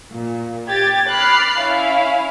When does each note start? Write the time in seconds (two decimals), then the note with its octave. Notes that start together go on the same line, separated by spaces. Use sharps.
0.13 A#2
0.68 G4 G5 G#6 A6
1.09 B5 D6 F6 F#6 A6 C7
1.59 C#4 E4 F5